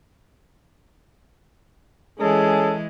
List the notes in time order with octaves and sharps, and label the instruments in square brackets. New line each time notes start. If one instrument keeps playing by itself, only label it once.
[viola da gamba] E3 G#3 [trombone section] C#4 G#4 A4